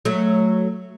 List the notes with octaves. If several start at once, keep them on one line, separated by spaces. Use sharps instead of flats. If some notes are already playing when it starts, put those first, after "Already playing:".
F#3 A3